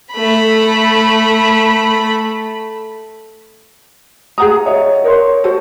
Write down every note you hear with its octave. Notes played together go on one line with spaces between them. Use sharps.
A3 B5
G#4 F#5 A#5 D#6
C#5 D#5 E5
A#4 C#5 C6
F#4 A4 C5